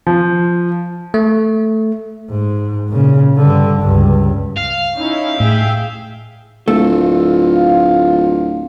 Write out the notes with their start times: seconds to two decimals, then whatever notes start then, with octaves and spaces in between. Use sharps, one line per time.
0.07 F3
1.14 A3
2.30 G#2
2.89 A#2 C#3
3.37 G2 D3
3.81 C#2 G2
4.58 F5
4.96 C#4 D#4 E4
5.40 A2 G#4 E5 G5
6.68 D1 A3 F4